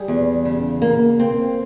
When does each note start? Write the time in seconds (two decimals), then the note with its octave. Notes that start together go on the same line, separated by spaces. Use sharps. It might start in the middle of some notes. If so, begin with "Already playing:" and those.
Already playing: G3 G#4
0.08 E2
0.45 C#3
0.82 A#3
1.20 C4